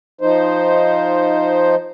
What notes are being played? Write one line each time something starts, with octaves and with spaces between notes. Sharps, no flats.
F3 D#4 C5